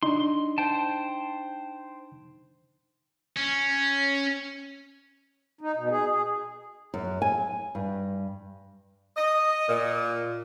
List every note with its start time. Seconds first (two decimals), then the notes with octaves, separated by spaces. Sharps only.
0.03 D4 D#4 C6
0.58 C5 G5 A5
3.36 C#4
5.61 D#4
5.76 B2
5.91 G#4
6.11 G#4
6.94 F#2
7.22 G#5
7.75 G2
9.17 D#5
9.69 A#2